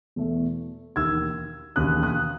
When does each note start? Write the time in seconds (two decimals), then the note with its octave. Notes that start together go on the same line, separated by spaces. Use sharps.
0.16 E2 B2 A3
0.96 E1 D#2 D#3 E6 G#6
1.76 E1 D#2 C#3 D#6 F#6
2.02 D#6 F#6